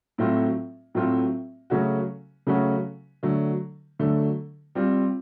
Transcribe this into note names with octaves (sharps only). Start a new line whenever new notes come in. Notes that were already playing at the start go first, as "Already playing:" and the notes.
A2 F#3 A3 C4 F4
A2 F#3 A3 C4 F4
C#3 F#3 A3 C#4 F#4
C#3 F#3 A3 C#4 F#4
D3 F#3 A3
D3 F#3 A3
G3 C4 F4